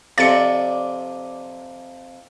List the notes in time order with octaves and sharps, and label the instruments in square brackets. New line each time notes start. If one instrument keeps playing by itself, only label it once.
[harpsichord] F2 C3 [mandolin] D5 [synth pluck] A6 C#7